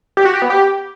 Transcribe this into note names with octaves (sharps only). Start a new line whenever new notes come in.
G4
F#4
G4
B3
G4